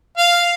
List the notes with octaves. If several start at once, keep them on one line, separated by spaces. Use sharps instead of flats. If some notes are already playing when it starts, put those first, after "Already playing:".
F5